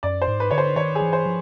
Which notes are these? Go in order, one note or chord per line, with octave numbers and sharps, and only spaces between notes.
F#2 D5
C5
G#2
B4
D3 C#5
C5
D#3 C#5
G#4
E3
C5
F3